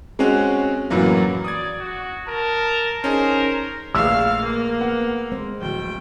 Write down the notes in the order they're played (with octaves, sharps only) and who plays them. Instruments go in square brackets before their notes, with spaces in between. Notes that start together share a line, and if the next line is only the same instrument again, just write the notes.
[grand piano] G#3 C4 C#4 F#4
F#2 A2 E3 F#3 A#3
[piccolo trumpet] D5 [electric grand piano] D#6 G#6
[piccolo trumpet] F#4
[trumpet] A#4 [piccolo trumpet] A5
[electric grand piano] C#4 D#4 G#4 [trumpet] A#4 [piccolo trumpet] C5
[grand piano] A#1 [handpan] A3 G#4 B4 [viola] F5 [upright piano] E6
[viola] A#3
[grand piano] B3 F#5
[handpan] G#3 C4 C5
[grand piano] D1 [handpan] F3 [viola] G5